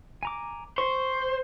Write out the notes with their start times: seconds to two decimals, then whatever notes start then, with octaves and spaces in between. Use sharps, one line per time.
0.23 G#5 A#5 D6
0.78 C5 C#6